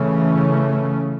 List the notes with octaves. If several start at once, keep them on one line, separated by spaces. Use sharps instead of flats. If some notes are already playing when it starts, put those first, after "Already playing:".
Already playing: C#3 E3 A3 C#4